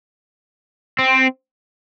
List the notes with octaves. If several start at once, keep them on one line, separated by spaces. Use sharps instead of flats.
C4